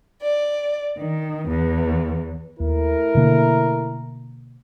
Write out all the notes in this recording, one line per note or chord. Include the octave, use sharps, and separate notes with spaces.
D5
D#3
E2
D#2 A3 E4 A#4
B2 D3 A#3